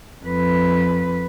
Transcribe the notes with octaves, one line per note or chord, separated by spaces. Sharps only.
F2 B4